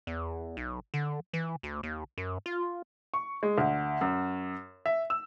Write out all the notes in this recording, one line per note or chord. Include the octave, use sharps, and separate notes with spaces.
E2
B1
D3
E3
D2
D#2
F#2
F4
C#6
G#3
D2
F#2
E5
E6